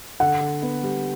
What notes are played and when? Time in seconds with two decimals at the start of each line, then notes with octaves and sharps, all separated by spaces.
0.20 D3 F#5
0.41 D3
0.62 B3
0.83 G3